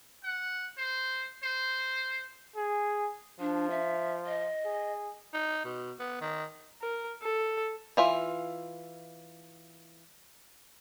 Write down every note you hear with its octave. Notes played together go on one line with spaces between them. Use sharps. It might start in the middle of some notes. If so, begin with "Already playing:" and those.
F#5
C5
C5
G#4
F3 D4
E5
D#5
G#4
D#4
B2
B3
D#3
A#4
A4
E3 F4 E5